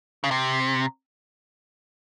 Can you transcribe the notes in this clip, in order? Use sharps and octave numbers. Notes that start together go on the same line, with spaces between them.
C#3
C3